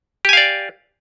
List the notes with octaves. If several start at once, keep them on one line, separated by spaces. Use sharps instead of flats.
G4 D5 F5 G#5